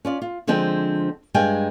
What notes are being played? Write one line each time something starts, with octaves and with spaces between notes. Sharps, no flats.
C#4 F4 D5
F4
D3 F3 G#3 C4 D4
G2 G#3 F5 G5 G#5